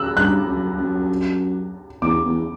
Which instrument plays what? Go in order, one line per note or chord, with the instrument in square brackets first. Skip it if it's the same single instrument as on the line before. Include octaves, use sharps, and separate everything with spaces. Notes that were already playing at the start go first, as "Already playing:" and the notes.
Already playing: [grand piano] E6 F#6
[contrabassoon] G2 [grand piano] F#6
[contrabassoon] F#2
F#2
[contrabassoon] E2 [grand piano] D6
[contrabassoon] E2